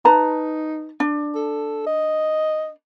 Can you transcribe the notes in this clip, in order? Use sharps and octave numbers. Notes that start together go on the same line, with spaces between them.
D#4 B4 A5 A#5
D4
A4
D#5